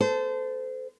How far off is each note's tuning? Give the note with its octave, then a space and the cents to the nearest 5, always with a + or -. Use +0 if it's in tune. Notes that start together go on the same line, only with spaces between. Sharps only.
A4 -5 C5 -30